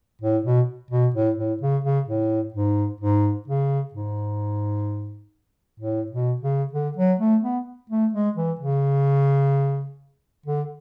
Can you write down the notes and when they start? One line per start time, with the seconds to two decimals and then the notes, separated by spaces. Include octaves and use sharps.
0.22 A2
0.44 B2
0.91 B2
1.14 A2
1.37 A2
1.61 C#3
1.84 C#3
2.08 A2
2.54 G#2
3.00 G#2
3.48 C#3
3.94 G#2
5.80 A2
6.11 B2
6.42 C#3
6.73 D3
6.97 F#3
7.20 A3
7.43 B3
7.90 A3
8.13 G#3
8.36 E3
8.59 C#3
10.46 D3